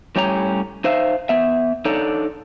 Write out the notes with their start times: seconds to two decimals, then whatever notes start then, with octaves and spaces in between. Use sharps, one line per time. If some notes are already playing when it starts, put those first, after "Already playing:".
0.16 A2 G3 C#4 G4 C#5 A#5
0.84 D#4 C5 E5 F5
1.29 B3 E5
1.85 D4 D#4 A4 C#5 D5